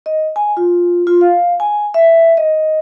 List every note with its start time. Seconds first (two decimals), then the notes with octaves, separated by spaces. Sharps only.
0.06 D#5
0.36 G#5
0.57 F4
1.07 F4
1.21 F5
1.60 G#5
1.94 E5
2.37 D#5